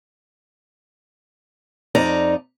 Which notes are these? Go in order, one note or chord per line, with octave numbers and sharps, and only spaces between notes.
F2 D#4 D5 A#5